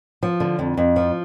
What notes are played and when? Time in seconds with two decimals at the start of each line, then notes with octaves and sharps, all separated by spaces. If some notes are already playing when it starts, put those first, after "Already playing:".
0.23 F3
0.40 D3
0.59 F2
0.77 F2
0.96 F3